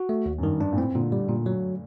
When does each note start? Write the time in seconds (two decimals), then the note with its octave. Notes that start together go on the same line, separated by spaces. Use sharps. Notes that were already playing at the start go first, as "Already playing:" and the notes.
Already playing: F#4
0.09 A3
0.26 D#2
0.38 F#2
0.43 G2 D#3
0.60 G2 D4
0.73 A#2
0.77 A2 C4
0.95 A#2 D3
1.12 G3
1.29 A#2
1.46 F#3